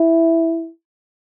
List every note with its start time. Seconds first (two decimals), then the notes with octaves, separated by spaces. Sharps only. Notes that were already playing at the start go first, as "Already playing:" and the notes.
Already playing: E4